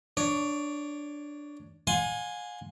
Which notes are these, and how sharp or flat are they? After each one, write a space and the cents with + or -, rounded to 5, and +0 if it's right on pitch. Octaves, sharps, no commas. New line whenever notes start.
D4 +0 C#5 +15
F5 +45 G#5 -5 C6 +0